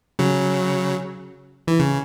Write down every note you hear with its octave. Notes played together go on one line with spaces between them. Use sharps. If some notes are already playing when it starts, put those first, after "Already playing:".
C#3 F#3
E3
C#3